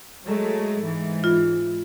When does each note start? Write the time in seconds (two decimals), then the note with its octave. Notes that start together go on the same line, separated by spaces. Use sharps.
0.24 F#3 G#3 A3
0.82 G#2 E3
1.24 F4